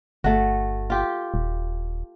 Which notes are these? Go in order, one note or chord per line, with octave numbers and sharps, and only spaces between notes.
G1 A3 F#4
F4 G4
D#1